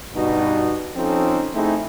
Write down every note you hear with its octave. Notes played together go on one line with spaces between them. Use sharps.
G2 B2 D#4 F#4
F3 C4 C#4 D#4 A4
A3 C4 D#4 E4 G#4